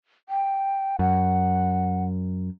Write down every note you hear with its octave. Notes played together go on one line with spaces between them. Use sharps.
G5
F#2 F#5